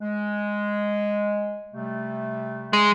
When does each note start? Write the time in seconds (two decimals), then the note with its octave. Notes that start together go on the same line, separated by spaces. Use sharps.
0.01 G#3
1.72 C3 G3 A3
2.73 G#3